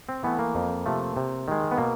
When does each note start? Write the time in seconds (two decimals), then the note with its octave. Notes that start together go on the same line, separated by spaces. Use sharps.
0.09 C4
0.24 E3 A3 B3
0.39 A#3
0.55 F2
0.86 C3 F3 A3
1.17 C3
1.48 D#3 G#3
1.71 B3
1.78 B2 A#3